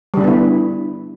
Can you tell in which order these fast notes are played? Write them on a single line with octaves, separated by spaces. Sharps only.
G3 D3 D4 B3 E4